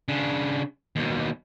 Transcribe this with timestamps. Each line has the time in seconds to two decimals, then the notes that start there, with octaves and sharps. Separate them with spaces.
0.08 C#3 D4
0.96 D#2 B2